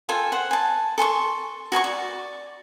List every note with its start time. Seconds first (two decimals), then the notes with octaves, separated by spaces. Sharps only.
0.09 F4 A4 G5 G#5
0.32 C5 F#5
0.51 G#5 A5
0.98 A4 G#5 C6 C#6
1.72 F#4 G#5 A5 C#6
1.84 D5